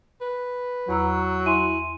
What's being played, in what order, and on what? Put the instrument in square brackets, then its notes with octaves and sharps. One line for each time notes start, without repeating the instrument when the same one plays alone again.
[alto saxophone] B4
[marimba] E2 A#5 E6 [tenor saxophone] F#3
[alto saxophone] E4 [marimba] G#5 [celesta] C6 D#7